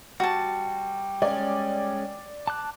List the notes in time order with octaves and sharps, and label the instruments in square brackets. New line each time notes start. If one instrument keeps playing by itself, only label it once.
[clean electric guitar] G3 [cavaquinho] F#4 A5
[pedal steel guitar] G#3 C#4 [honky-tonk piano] D5
[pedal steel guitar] A5 D6 F#6